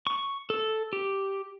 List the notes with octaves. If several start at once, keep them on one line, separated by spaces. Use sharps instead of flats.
C#6
A4
G4